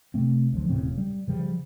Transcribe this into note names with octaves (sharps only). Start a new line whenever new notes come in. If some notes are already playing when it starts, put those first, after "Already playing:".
C3 A3 C4
D2 F3
E1 A2 C#3 C4
G3
C#3 F3 G3